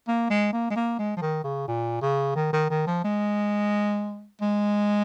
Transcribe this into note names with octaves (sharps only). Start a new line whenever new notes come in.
A#3
G#3
A#3
G#3
A#3
G#3
F3
D#3
C#3
A#2
C#3
D#3
D#3
D#3
F3
G#3
G#3